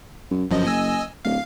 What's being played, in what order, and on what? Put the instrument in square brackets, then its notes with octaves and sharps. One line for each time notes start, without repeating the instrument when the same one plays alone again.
[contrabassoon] F#2
[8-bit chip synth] G1 F3 D#5 [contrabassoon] F#2
[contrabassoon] F#1 [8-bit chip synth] D#5 G#5 E6
[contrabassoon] D1 [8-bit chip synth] F5